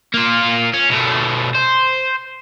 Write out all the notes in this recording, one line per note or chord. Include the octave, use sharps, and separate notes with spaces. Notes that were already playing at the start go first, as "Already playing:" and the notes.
A#3 F4
C#4
B2 A3
C5